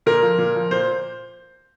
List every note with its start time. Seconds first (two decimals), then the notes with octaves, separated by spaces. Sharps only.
0.06 A#2 A#4
0.22 F3
0.38 A#2
0.55 F3
0.71 A#2 C5